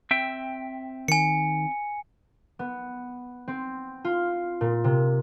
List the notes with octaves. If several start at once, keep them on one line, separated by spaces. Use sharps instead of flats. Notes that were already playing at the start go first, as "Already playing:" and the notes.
C4 E5 G5
D#3 G#5 C#7
B3
C4
F4
A#2
C3